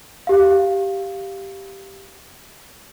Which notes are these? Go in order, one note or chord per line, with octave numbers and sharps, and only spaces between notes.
G4 F5